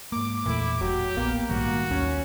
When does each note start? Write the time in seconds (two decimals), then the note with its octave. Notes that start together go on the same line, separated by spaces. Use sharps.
0.12 G#2 A#3 D6
0.46 A1 E2 A#2 A3 E4
0.81 E1 F#3 G4
1.17 A#1 A#3 B3
1.50 A#1 G#2 D#3 G3 F#4
1.91 D#2 C#4